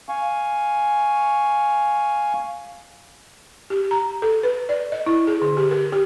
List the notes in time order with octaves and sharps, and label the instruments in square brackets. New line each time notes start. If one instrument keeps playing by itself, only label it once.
[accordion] F5 G#5 C#6
[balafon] G4
A#5
A4
B4
D5
D#5
E4
G#4
D3
G4
A#4
G4